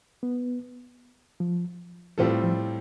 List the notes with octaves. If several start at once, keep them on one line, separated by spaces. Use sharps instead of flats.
B3
F3
A2 E3 G3 C4 F4 A4
F3